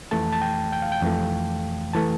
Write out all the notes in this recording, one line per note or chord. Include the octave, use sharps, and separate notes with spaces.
F2 E3 A3 A5
A5
G5
G5
F5
G5
F2 E3 A3
E3 A3 A5